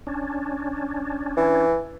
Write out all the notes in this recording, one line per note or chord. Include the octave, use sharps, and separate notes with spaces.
C#4 D4
E3